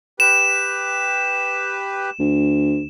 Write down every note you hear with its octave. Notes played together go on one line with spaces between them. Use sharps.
G4 B4 E7
D2